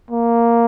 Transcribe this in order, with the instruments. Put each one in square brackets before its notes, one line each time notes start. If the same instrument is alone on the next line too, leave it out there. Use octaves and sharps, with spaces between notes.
[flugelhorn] A#3